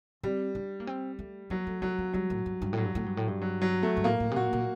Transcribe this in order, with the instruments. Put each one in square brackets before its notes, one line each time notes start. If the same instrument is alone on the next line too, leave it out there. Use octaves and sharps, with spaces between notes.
[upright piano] G3 [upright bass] C4
[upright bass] D4
A#3
C4
A3
[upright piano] F#3 [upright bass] A#3
[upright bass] A3
[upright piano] F#3 [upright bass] A3
[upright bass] A#3
[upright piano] F#3 [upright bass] G3
[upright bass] A2
G2
G2
[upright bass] A2 [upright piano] F#3
[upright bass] G2
A2
G2
A2
G2
[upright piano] F#3
F#3
A3
[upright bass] G2
[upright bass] A2 [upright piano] A#3
[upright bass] A2
C3
[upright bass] A#2 [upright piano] F#4
[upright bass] A#2